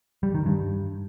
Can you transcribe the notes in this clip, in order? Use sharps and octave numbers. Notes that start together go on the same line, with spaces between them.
G3
D#3
G2